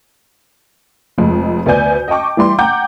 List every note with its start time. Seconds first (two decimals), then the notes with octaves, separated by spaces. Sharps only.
1.18 F1 F2 G#3
1.66 D2 B3 D5 G#5 G6
2.08 D#5 G5 A5 C#6 D6
2.37 E3 G3 C6
2.58 F#5 G5 A#5 D6 G6